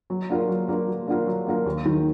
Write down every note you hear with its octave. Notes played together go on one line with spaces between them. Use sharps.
F#3
A#3 D4 F4 A#4
F#3
A#3 D4 F4 A#4
F#3
A#3 D4 F4 A#4
F#3
A#3 D4 F4 A#4
D#2
D#3 F#3